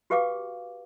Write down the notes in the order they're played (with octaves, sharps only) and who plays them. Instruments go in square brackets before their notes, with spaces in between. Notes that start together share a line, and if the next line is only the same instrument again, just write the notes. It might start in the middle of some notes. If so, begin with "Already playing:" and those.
[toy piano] F#4 G4 B4 F5 G5 D6